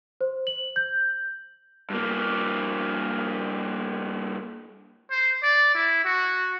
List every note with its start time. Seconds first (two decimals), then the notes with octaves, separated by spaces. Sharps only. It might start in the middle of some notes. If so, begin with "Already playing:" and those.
0.21 C5
0.47 F#7
0.76 G6
1.90 G2 A#3
5.11 C5
5.43 D5
5.75 E4
6.05 F#4